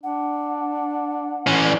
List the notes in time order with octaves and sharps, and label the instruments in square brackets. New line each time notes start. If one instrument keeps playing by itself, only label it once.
[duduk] D4 [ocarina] F#5
[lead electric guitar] E3 C#4
[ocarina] D5